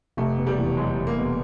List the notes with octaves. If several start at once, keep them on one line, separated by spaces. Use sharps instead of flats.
F1 A3
B2
G3
E2
F#3 G#3
F1
A#3
B2